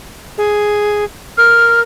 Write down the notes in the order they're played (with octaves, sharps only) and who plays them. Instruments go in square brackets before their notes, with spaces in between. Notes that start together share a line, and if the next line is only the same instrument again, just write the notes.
[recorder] G#4
[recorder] A#4 [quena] F6